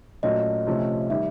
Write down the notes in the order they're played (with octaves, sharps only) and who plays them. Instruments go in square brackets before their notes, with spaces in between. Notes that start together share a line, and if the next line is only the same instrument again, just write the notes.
[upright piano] A#2 F#3 A3 C#4 [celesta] D#5
[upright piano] C3 F3 A3 C#4
[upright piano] D#3 G3 [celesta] E5